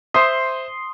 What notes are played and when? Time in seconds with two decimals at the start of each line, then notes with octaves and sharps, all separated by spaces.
0.14 C5 E5 C6 D#6